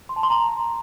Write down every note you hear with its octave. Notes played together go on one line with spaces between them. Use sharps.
C6
A5
C6
A#5